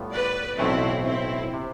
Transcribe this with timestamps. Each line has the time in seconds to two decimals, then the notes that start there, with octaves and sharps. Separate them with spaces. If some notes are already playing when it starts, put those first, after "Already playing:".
Already playing: A2 G3 B3 F4
0.13 B4 D5
0.58 B1 A2 E3 A3 C4 E4
1.04 C4 E4
1.54 C3